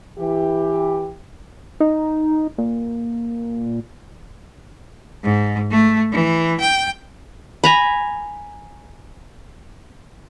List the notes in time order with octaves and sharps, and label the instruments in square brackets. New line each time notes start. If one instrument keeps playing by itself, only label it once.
[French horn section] E3 G4
[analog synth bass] D#4
A#2
[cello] G#2
A3
E3
G5
[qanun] G#5 A#5 B5